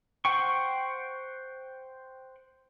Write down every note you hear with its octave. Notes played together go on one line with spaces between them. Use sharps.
C5 F#5 G5 C#6